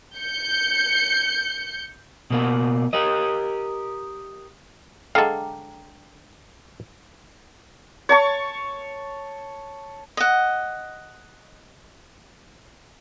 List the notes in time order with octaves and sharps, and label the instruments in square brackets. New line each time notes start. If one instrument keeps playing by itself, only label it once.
[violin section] G6 C#7
[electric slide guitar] B2 A#3 F#5
G4 A#4 D#5
[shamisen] D3 G#3 [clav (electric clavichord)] A4 F5 [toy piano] G5 A#5 D6
[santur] C#5 A5 C#6
[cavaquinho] D#5 F#5